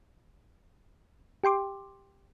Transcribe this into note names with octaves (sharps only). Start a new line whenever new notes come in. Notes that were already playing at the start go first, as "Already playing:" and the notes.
G4 G5 C6 D6